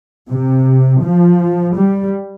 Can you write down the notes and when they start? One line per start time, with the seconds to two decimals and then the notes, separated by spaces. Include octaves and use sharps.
0.31 C3
1.03 F3
1.75 G3